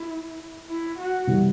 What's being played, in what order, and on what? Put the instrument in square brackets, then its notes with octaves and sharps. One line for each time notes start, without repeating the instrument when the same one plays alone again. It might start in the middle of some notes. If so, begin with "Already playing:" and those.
Already playing: [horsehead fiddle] E4
E4
F#4
[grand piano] C3 E3 G3